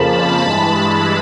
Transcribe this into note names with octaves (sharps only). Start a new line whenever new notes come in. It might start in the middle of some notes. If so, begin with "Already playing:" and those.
Already playing: F2 C#3 F3 A#3 A5 B5
G2 E3 G#3